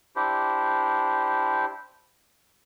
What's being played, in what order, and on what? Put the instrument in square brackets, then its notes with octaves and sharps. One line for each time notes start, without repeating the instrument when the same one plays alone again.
[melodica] D4 E4 G4 C5